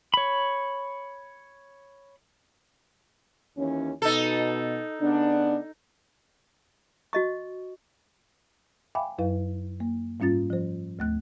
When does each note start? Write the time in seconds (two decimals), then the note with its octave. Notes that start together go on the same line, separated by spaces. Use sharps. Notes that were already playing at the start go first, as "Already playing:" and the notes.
0.14 C#5 B5
3.58 D#2 E3 C#4
4.02 B2 D#4 A4
5.01 C#3 B3 D4
7.13 F#4 D#5 C#6
8.95 E5 F5 G5 G#5 B5 D6
9.18 F#2 F#3 E4 B4 F5
9.80 A#3
10.20 G#2 G3 C#4 F4 A6
10.50 F3 C5
10.99 D2 A3 F#6